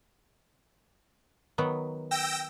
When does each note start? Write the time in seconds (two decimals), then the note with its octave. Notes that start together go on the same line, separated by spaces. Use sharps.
1.58 D#3 F#3 B3
2.11 G5 E6 A#6